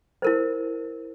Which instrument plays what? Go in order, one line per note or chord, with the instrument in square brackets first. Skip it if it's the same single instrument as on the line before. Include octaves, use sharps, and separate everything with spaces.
[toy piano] E4 A#4 C5